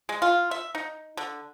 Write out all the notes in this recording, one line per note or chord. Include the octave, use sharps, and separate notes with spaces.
G#3
F4
E5
D#4
D3